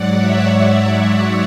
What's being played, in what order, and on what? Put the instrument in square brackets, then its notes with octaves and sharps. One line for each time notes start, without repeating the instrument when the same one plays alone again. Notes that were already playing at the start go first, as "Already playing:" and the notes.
Already playing: [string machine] G#2 F#3 D5 F#5
C#5 E5
C#5 E5
D5 F#5